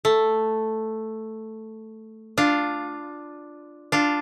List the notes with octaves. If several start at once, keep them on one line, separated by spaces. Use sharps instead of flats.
A3
D4 F4
D4 F4